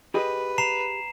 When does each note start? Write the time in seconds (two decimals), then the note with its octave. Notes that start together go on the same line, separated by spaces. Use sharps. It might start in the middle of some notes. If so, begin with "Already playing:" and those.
0.14 G4 G#4 B4 D#5
0.58 A#5 C7 E7